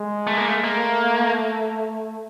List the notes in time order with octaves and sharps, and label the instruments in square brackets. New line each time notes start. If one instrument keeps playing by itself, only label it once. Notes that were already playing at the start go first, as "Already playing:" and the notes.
Already playing: [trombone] G#3
[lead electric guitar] A3
A#3
A3
[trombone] A3 [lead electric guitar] A#3